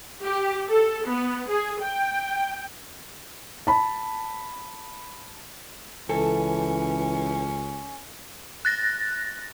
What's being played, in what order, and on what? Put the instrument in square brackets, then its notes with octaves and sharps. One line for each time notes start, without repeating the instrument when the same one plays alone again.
[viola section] G4
A4
B3
G#4
G5
[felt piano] A5 B5
[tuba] C#2 [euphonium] E3 [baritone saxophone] C#4 [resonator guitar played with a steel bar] A4
[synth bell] F#6 A6 A#6